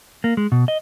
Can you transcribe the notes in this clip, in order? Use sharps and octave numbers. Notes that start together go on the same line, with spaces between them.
A#3
G#3
B2
D#5